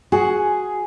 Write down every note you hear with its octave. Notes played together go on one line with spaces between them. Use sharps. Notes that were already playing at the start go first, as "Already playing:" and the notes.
F#4 G#4